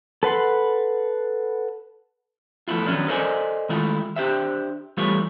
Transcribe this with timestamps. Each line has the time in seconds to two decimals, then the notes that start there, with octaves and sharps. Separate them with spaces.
0.23 A4 B4 F#5 C6
2.68 F3 A3 B3 E4 F4
2.86 D#3 F#3 G3 B3 C#4 D4
3.08 A4 A#4 C5 D5 D#5 G#5
3.69 D#3 G#3 A3 E4 F4
4.16 D4 G4 C5 E5
4.97 E2 G3 A3 F4 B4 C#5